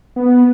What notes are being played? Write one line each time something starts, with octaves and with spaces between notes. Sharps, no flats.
B3